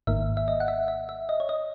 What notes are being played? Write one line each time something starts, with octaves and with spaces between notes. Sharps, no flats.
G#1 G#2 D#3 A#3 E5
E5
D#5
F#5
E5
E5
E5
D#5
C#5
D#5